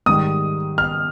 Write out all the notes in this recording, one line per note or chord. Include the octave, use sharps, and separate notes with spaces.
G#2 D#3 G3 D#6
F6